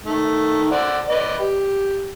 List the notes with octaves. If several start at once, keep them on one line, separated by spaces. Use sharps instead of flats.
D#3 A3
C5 D5 F#5
B4 D5 D#5
G4